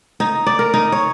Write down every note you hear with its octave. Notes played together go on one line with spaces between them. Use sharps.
D#4
D5
A#4
D#4
C#5